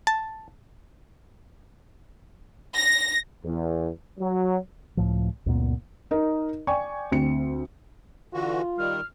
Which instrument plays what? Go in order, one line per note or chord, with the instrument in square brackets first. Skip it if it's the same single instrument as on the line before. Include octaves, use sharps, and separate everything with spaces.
[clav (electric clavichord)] A5
[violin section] A#6
[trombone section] E2
F#3
[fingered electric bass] C#2 A2 F3
C#2 F#2 A#2 B3
[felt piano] D#4 A#4 D#5
D5 G5 G#5 C#6
D2 C4 C#7
[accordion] D3 E3 F#4 [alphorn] F4
[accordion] D#3 G3 [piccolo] F6